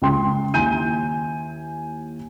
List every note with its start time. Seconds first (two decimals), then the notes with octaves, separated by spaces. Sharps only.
0.02 C#2 G5 C6
0.54 D#2 E4 G#5 G6 D#7